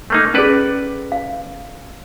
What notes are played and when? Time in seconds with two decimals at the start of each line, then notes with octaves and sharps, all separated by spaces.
0.10 A3 A#3 D#4
0.34 C#4 G#4 A4 B4 D5
1.12 F5